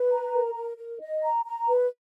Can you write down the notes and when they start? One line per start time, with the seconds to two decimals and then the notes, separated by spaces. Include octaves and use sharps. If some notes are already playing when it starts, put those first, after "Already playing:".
Already playing: B4
0.09 A#5
0.32 A#4
0.54 A#4
0.76 A#4
1.00 D#5
1.23 A#5
1.46 A#5
1.69 B4